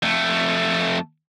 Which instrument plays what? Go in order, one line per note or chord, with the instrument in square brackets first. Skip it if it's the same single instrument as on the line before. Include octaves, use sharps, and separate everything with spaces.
[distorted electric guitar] F2 A3